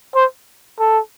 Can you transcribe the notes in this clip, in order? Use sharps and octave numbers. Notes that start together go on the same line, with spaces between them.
C5
A4